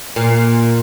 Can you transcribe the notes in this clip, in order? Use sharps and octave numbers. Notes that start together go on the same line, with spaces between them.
A#2